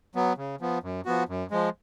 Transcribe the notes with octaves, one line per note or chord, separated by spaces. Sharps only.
F#3 B3
C#3
F3 B3
F#2
F3 B3 F#4
F#2
F3 G#3